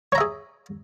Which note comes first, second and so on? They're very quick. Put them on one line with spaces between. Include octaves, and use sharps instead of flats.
C#5 A#5 E5 G#4